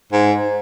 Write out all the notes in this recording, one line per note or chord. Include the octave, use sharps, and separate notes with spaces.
G#2